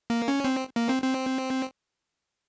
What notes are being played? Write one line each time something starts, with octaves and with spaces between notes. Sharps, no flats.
A#3
C#4
C4
A#3
C4
C4